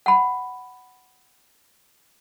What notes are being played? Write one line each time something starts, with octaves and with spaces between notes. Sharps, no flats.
F#5 B5